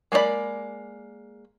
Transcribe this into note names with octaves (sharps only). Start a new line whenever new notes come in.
G#3 A#3 D4 D5 B5